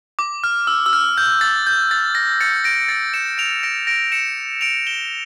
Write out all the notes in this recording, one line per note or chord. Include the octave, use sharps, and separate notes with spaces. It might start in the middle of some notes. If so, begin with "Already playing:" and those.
D6
F6
E6
E6
F6
G6
A6
G6
A6
A#6
A6 C#7
A#6 D7
A6 C#7
C#7 E7
D7 F7
A#6 D7
A#6 D7
C#7 E7
D7 F7
E7 G7